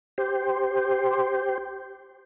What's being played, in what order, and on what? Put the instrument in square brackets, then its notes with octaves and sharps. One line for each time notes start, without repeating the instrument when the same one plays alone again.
[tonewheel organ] G4 C5